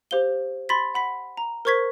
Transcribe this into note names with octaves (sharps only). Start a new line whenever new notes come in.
G4 C5 F5 G7
B5 C6 A6 B6
F#5 B5 B6
A#5
A#4 C5 C#6 G#6 B6